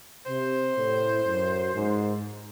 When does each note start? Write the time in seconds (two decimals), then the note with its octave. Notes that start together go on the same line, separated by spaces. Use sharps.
0.26 C3 C5
0.75 A2
1.25 F#2
1.73 G#2